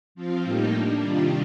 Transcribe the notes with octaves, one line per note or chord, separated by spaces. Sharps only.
F3 C4 F4
A2 G3 A#3 D#4 G4
G3 A#3 D4
C3 D#3 G3 D4 F4